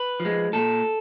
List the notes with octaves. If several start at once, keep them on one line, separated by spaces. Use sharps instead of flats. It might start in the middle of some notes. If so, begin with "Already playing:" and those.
Already playing: B4
F3
G#3
A#2 A4